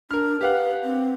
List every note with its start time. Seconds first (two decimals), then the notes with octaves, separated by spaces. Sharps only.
0.11 D4 A#4 F6
0.41 G4 B4 F5 F#5
0.84 C4